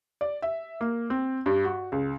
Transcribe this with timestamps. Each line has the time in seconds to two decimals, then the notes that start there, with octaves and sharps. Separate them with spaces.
0.21 D5
0.42 E5
0.81 A#3
1.10 C4
1.46 G2
1.64 F#4
1.92 C#2